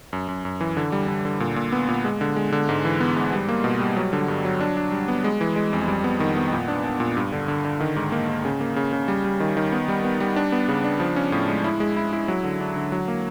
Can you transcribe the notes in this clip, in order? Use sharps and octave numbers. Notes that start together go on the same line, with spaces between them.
F#2
F#2
F#2
E3
D3
G3
D3
D3
A#2
A#2
B3
A#2
G#3
D3
G#3
D3
G#2
E3
B3
G#2
G3
A#3
B2
G3
F#3
D3
G2
F#3
D4
D4
G3
B3
G#3
E3
G#3
F2
G3
B3
D#3
B3
A#2
D4
D4
A#2
G2
D3
D3
D3
D#3
G#2
A#3
G#2
C#3
A#3
C#3
C#3
G3
G3
D#3
D#3
B3
G3
B3
G3
D4
B3
C#3
D4
F3
C#4
A2
G#3
E4
G#3
E4
E4
F#3
D3
D4
D3
F#3
A#3